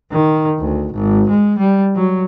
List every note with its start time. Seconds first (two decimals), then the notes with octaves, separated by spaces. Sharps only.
0.11 D#3
0.59 D2
0.94 G#1
1.30 G#3
1.58 G3
1.95 F#3